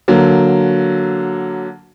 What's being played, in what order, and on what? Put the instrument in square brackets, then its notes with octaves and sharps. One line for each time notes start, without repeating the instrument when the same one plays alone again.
[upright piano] D3 F#3 A#3